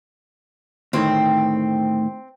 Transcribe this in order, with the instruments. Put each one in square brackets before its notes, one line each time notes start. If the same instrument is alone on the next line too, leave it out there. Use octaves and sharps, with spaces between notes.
[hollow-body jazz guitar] D2 A2 D#3 [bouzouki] C4